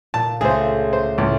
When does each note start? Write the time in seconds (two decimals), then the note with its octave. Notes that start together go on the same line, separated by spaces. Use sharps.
0.14 A#2 A5
0.41 C#2 A3 G#4 C5
0.93 C5
1.18 C#2 A2